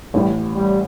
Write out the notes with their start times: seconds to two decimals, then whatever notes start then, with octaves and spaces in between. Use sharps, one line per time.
0.14 A1 A2 E3 G3
0.56 G3